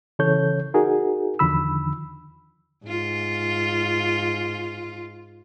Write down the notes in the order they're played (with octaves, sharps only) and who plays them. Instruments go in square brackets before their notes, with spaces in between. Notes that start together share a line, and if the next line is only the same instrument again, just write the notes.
[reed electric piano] C#3 E3 A4 C#5 G6
D#4 F#4 G#4 A#4
E2 D3 D#3 F3 B5 E6
[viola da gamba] G#2 F4